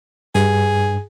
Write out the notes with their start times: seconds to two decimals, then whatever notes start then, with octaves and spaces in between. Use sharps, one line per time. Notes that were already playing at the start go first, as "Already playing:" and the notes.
0.35 G2 G#4